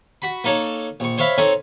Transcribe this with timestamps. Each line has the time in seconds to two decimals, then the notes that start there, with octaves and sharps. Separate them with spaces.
0.22 F#4 B5
0.44 A#3 D#4 A4 C#5 A5
1.00 A#1 C#6
1.18 C5 C#5 E5 F5 B5
1.38 C4 D#4 A4 C#5